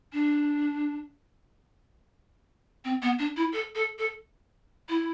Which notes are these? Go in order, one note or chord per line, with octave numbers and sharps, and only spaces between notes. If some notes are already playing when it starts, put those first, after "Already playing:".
D4
C4
B3
D4
E4
A4
A4
A4
E4